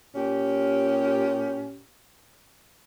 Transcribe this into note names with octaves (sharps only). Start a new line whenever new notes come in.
A#2 C#4 G4